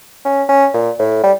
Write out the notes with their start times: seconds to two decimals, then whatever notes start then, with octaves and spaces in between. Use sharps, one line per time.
0.25 C#4
0.49 C#4
0.74 A#2
0.99 A2
1.23 G3